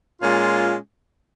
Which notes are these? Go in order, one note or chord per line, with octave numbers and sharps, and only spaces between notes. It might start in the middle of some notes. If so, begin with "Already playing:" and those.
A#2 G#3 C#4 F4